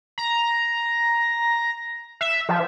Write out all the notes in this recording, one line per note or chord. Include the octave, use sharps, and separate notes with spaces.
A#5
E5
F3